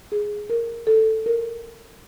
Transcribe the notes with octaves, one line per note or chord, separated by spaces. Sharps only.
G#4
A#4
A4
A#4